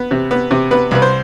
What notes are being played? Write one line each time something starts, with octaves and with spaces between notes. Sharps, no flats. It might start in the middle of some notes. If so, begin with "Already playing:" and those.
Already playing: B3
C3
B3
C3
B3 B4
C2 B4
C5